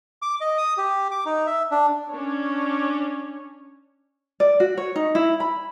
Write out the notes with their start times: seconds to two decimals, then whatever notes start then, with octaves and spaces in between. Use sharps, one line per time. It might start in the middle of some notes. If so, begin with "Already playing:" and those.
0.22 D6
0.41 D#5
0.58 D#6
0.77 G4
1.11 D6
1.26 D#4
1.47 E5
1.71 D4
2.09 C#4 D4 C#5
4.40 D5
4.60 F#4
4.77 C#5
4.96 D#4
5.15 E4
5.40 B5